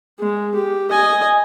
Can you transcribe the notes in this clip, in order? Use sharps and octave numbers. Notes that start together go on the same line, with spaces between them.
G#3
G4
D#5 G#5